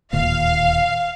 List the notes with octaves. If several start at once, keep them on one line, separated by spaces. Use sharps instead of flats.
D1 D#2 A#2 F5